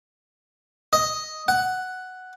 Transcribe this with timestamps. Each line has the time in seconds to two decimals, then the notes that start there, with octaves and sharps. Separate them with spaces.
0.93 D#5
1.48 F#5